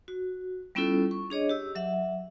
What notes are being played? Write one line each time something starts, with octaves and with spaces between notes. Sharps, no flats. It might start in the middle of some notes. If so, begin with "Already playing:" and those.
F#4
G3 B3 C#4 E4 F4 A4
C#6
D4 G#4 C#5 D#5
G4 E6
F#3 E5 F#5